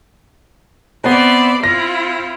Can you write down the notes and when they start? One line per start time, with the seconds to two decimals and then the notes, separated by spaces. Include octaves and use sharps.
1.04 B3 C4 B4 D5 E5 C6
1.64 C4 E4 F4 A#6